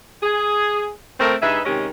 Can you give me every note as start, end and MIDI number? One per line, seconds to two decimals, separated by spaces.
0.23 0.90 68
1.20 1.35 57
1.20 1.35 60
1.20 1.35 70
1.42 1.60 43
1.42 1.60 63
1.42 1.60 68
1.42 1.60 71
1.42 1.60 76
1.65 1.88 48
1.65 1.88 51
1.65 1.88 56
1.65 1.88 61
1.65 1.88 67
1.65 1.88 75